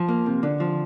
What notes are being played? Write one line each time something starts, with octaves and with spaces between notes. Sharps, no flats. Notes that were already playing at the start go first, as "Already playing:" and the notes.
Already playing: F3
A#3
C3
D3
F3